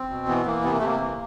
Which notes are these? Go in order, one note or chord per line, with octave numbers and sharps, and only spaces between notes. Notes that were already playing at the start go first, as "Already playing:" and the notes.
Already playing: C4
B2
E3 B3
E3 A#3
C3 B3
A#3
A3
C3 A#3
E3